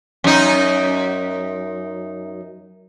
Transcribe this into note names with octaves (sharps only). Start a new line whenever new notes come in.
F#2 D#4